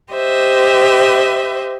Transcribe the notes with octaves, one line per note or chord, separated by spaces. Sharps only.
G4 C5 D#5 E5